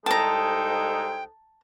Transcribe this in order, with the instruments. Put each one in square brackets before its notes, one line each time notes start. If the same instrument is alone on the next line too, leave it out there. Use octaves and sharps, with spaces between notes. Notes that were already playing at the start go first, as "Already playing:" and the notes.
[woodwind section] C2 G#3 D#4 [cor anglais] A4 [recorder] G5 [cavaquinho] A5 A#5